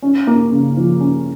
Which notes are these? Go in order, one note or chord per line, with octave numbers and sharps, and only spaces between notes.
C#4
A#3
C#3
F3
C#4